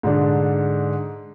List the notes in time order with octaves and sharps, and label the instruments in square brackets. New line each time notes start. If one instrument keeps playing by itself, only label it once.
[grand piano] G#2 D3 D4